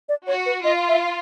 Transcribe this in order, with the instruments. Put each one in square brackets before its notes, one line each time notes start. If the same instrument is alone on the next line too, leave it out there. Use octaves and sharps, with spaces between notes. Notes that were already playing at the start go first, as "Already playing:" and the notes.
[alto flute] D5
[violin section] F#4 [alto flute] C#5
[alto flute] B4
[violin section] F4 [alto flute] D#5
[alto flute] E5